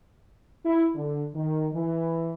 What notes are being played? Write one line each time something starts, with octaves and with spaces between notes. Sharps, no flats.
E4
D3
D#3
E3